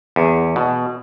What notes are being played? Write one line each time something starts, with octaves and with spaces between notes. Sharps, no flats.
E2
B2